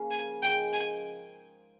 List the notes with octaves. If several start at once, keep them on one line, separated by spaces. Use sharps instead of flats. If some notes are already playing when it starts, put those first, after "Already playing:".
Already playing: C#3 F3 A#3 C#4
G#5
G#2 F3 G#3 G5
G#5